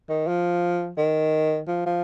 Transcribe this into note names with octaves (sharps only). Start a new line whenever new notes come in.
D#3
F3
D#3
F3
F3